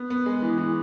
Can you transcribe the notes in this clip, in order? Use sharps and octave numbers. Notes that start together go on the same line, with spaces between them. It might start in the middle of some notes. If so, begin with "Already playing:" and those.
Already playing: B3
B3
G#3
E3
E3